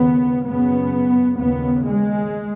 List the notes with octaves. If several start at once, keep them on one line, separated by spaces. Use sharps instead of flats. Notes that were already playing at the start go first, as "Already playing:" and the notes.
Already playing: D#2 C#3 B3
F#2 C#3 B3
D#2 C#3 B3
G#3